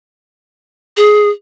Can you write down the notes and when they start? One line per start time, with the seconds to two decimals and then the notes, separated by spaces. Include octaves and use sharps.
0.97 G#4